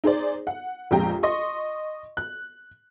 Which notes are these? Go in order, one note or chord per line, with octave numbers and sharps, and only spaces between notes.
D#4 G#4 C5 D5
F#5
A#1 F2 G#3 G4 G5 A#5
D#5 C6 C#6
F#6